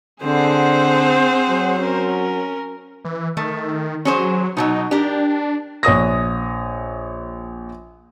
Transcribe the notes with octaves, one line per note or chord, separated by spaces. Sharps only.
D3 C4 G#4 C5 F#5
F#3
C#4 A#4
E3
D#3 A3
F#3 C#4 G#4 C5
B2 F3 F#3 D#4
D4 G4 A#4
A#1 C#5 D#6 A#6